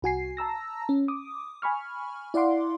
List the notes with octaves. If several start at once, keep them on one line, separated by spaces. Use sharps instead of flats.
C2 F#4 G#5 C7
A5 A#5 E6 A#6
C#4
D6 D#6
G#5 B5 C#6 F6
E4 D5 F5 F#5 C6 D6